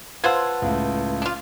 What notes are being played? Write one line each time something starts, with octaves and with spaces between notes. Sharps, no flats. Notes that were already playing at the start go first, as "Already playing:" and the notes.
F4 B4 C5 F#5 A5 C6 E6 G#6
C#2 A2
D4 F4